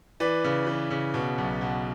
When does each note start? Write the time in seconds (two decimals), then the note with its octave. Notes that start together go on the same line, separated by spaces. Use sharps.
0.20 E3 B4 D5
0.44 C#3
0.67 E3
0.91 C#3
1.14 B2
1.38 B1
1.61 B2